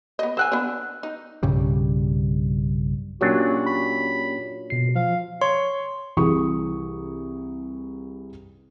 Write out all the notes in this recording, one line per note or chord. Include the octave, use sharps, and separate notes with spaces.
B3 D#5
C5 G5 G#5 E6 F#6
B3 D4
D#4
B1 G2 C#3 G3
A#2 F#3 A#3 C#4 D4 F#4 G4
B5
B2 C7
F3 F5
C#5 C6
C2 E3 E4 G#4 C#6 D#6